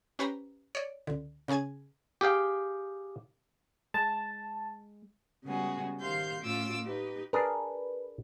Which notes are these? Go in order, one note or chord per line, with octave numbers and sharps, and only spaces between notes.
C#4 G4 B4 C5 G5 A#5
C#5 D5
C#2 D3
C#3 C#4 G#4 G#5 G#6
G4 G#4 F5 G5
G#3 A5
C#3 G3 G#3 B3 F#4 G#4
D#3 G4 C5 F5 C6 G6
A2 A3 C#4 F4 D6 E6
D#4 G4 B4
D4 G#4 A#4 B4